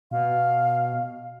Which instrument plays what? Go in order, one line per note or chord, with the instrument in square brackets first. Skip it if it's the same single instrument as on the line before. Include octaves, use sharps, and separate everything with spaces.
[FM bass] B2 [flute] F5